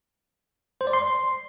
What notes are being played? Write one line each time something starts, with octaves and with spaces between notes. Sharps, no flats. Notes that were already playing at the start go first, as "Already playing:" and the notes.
C5
D5
C6